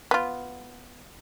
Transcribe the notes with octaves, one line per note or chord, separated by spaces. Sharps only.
B3 F4